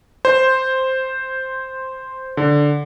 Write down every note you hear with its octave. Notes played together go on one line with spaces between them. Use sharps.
C5
D3